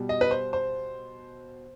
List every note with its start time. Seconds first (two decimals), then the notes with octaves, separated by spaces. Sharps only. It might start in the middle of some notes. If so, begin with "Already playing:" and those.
Already playing: B2 G3
0.09 D#5
0.21 B4
0.31 C5
0.53 C5